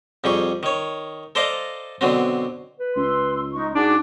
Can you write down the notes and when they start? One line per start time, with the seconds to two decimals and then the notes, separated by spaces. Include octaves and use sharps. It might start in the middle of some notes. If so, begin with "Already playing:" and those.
0.24 F2 G3 G#4 C#6
0.63 D#3 C#5
1.35 A4 C5 D5 D#5 F5 A#5
2.01 B2 D3 F#3 C4
2.79 B4
2.96 C#2 C6 E6
3.53 G#3 D#4 C#6
3.75 G#2 D4 F#4 G#4 D6